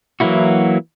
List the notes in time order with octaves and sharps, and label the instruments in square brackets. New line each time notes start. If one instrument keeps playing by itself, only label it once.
[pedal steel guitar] E3 F#3 A#3 E4 F#4